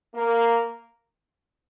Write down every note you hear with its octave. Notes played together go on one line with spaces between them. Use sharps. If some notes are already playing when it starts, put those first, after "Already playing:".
A#3